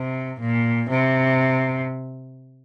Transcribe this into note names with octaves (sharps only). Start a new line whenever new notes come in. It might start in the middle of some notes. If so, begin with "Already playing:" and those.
Already playing: C3
A#2
C3